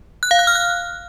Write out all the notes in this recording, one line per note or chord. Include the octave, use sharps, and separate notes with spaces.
F#6
F5
F#6
F6
F#6